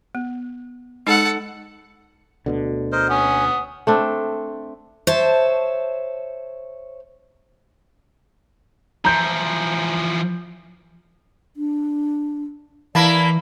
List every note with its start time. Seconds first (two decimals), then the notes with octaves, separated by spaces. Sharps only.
0.15 B3
1.07 G#3 D#4 A4 F#5
2.46 D2 B2 D3
2.92 A#4 C5 D#5
3.10 C#4 F#5 D#6
3.87 A3 C4 D4
5.07 C5 C#5 E5 A5
9.05 E3 F3 A#5 G6
11.56 D4
12.95 E3 A#3 E4 D5 A5 B5